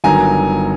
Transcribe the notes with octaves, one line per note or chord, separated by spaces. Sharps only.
G1 G2 D#3 F#3 G#5 A#5